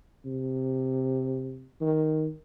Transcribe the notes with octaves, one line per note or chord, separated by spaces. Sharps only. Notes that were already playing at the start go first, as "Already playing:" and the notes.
C3
D#3